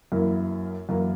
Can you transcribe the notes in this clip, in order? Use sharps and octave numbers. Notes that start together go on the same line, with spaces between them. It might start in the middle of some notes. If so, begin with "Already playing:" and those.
F#2 E3 A#3 E4 A#4
F#2 E3 A#3 E4 A#4